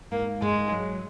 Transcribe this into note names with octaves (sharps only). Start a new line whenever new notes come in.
G#2 A#3
G#2 G#3
F#3